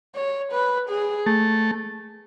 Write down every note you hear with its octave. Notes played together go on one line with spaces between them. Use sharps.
C#5
B4
G#4
A3